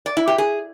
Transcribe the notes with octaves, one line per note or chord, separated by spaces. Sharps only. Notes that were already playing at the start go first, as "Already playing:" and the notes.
D5
E4
G4
G#4